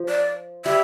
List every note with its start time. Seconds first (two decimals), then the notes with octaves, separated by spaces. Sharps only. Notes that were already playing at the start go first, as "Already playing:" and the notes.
Already playing: F3
0.09 D5
0.65 G3 E5